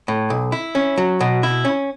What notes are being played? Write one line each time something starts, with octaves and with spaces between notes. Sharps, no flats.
A2
B1
E4
C#4
F#3
B2
E4
C#4